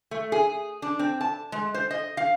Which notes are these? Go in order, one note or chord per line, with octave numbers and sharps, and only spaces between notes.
A3
G#4
D4
C4
A5
G#3
C5
D#5
F5